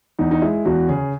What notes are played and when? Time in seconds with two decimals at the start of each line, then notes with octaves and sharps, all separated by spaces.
0.19 E2 D#4
0.31 D#4
0.42 G#3 E4
0.65 E2 F#4
0.89 C#3 G#4